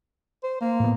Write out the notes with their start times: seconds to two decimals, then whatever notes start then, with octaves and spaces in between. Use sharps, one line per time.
0.43 C5
0.61 A#3
0.80 A2 B3